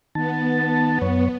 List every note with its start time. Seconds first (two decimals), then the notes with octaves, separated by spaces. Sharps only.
0.15 D#3 B3 A5
1.02 F#2 C#5